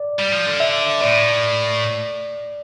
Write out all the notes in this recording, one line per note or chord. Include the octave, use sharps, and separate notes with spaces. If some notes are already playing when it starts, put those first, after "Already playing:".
Already playing: D5
G3
F3
D3
E5
A2 D5